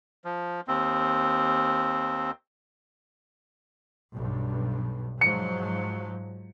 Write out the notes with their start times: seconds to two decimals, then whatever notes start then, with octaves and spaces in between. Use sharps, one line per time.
0.25 F3
0.68 D#2 C4
4.15 B1 G2
5.21 G#2 F3 F#3 C#7